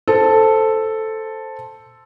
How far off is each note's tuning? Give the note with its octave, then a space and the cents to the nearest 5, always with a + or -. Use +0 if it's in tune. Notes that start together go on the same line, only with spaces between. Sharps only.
A4 +0 C5 +0